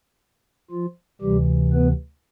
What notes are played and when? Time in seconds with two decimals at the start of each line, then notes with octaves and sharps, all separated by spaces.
0.71 F3 F4
1.21 D2 C3 E3 G3 G4
1.73 B3 B4